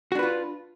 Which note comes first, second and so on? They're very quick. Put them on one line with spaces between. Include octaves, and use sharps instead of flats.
F#4 D4 B4 F4